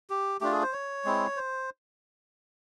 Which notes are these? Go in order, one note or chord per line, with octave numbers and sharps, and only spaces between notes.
G4
A3 D4 F4 G4
G#4
C5
C#5
G#3 C4 E4
C5